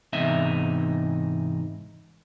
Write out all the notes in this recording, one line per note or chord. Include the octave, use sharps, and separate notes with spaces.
E2 G#2 C3 D#4 E5